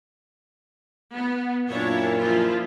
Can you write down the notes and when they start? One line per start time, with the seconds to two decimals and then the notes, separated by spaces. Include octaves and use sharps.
1.15 B3
1.69 F#2 A#2 A#3 D4 E4 C#5
2.18 F3 E4 F4